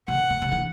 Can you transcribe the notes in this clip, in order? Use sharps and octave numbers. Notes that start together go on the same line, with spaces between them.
C3 F#5
B2
C3
E3